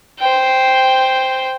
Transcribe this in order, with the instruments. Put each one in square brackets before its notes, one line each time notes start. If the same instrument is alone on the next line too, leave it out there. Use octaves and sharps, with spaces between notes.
[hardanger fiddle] C5 G5